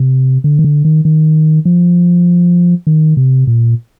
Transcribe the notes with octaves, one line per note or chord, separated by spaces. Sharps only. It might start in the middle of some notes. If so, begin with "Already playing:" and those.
Already playing: C3
D3
D#3
D3
D#3
D#3
F3
D#3
C3
A#2